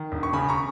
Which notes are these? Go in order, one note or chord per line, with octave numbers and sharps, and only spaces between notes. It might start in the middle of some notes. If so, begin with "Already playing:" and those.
Already playing: D#3
E1
C#6
C#3 G#5 B5
A#5 C#6